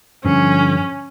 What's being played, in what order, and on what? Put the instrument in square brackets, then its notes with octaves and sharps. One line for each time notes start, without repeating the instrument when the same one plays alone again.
[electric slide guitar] G2 D3 F3 [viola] C#4